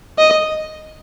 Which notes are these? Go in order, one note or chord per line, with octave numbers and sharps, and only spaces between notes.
D#5